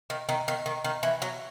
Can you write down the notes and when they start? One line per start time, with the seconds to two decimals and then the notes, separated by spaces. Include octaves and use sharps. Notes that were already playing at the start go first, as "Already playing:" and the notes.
0.10 D#3
0.29 D#3
0.48 D#3
0.66 D#3
0.84 D#3
1.03 E3
1.22 F#3